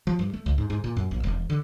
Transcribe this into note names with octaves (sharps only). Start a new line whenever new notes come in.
F3
G2
A3
C#2
G#2
G#2
A#2
F#2
A#1
E1
D3